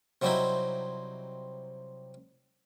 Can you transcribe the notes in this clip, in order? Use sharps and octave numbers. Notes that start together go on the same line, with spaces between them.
C3 F#3 G3 C4 D#4 E4